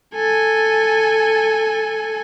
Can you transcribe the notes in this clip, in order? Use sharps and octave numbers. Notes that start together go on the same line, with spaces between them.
A4 G#5